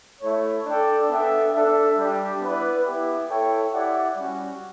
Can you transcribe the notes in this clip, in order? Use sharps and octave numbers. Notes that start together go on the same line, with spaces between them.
A3 E4 A4 C#5
D4 A4 D5 G5
B3 D4 A4 E5 G5
D4 A4 E5
G3 D4 G4
B3 E4 B4 D5
B3 E4 G4
E4 A4 C#5 G5
E4 G4 D5 F#5
G3 C#4 F#4